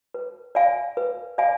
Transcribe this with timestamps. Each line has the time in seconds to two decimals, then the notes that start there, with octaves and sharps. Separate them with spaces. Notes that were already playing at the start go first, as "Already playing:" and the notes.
0.14 B4
0.55 D5 F5 G#5
0.97 B4
1.38 D5 F5 G#5